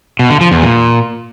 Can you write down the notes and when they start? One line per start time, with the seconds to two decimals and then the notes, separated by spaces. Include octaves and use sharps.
0.19 B2
0.30 D3
0.41 F3
0.51 E2
0.62 A#2